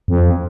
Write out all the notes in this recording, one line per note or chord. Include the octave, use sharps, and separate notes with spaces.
F2